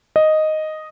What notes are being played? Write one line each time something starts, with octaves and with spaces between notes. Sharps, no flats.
D#5